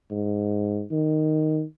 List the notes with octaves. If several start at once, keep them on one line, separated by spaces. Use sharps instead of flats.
G#2
D#3